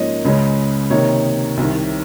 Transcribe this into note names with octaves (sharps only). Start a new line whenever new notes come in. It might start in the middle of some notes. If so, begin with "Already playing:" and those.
Already playing: G#2 F3 A#3 C#4 C#5 D#5
C#2 C#3 G#3 C#4
C3 D#3 A#3 D#4 C#5
C2 C3 D#3